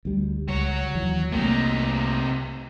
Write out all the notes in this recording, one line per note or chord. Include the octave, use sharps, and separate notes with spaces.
D2 G3
C#2 F#4 C#5
D#2 E3 F#3
C2 C3 A3 A#3 D#4